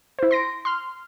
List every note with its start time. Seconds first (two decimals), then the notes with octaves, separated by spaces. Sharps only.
0.19 E4 C5
0.31 C6 A#6 D7
0.65 C6 F6